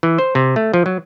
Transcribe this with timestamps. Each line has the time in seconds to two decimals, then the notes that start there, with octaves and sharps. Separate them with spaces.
0.03 E3
0.18 C5
0.35 C3
0.56 A3
0.73 F3
0.86 F#3